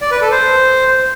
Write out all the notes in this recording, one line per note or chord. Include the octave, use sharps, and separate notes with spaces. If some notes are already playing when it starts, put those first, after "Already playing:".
D5
B4
A4
C5